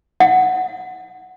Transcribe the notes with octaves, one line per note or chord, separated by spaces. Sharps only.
F#5